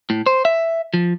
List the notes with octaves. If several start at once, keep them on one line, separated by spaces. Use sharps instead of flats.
A2
C5
E5
F3